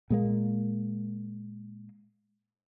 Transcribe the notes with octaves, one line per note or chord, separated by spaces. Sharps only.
A#2 G#3 A#3